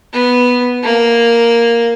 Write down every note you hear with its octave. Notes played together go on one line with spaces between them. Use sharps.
B3
A#3